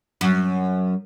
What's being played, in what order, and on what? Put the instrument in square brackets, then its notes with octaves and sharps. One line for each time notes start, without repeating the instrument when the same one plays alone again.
[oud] F#2